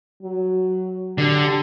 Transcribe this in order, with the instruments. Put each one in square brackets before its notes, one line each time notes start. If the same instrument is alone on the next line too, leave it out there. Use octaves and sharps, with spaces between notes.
[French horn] F#3
[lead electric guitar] D3 [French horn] G4